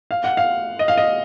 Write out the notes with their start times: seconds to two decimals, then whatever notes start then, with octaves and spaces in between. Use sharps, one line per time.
0.11 F5
0.24 F#5
0.37 F5
0.79 D#5
0.88 F5
0.97 D#5